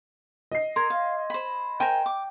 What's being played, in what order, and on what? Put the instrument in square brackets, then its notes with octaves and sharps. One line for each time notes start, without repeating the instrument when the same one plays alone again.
[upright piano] D#5 C7
[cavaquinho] A#4 [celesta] C6 G#6
[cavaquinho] F5
C5 B5
[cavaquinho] A#4 C5 G#5 [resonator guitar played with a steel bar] G5
[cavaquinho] D6